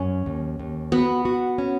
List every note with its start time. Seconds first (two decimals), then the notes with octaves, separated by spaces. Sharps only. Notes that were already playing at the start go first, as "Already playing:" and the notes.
Already playing: F#2 C#4
0.26 D#2
0.59 D#2
0.92 B3 F#4
1.25 F#4
1.58 C#4